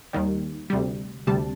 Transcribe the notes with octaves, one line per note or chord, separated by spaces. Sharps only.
D#2 D#3 G3
D2 C3 G3
D2 C3 G3 A5